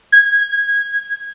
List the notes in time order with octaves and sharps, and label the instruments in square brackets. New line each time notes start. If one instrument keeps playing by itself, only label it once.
[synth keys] G#6